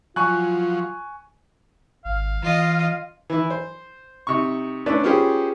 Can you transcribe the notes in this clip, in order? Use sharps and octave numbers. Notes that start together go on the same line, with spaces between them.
F3 F#3 F4 G#5 C#6 F#6
G#1 F5
E3 F4 D#5
E3 E4
C5
C3 D#4 C#6
A3 C#4 D4 A4 B4 D5
B3 C#4 F4 G4 G#4 C5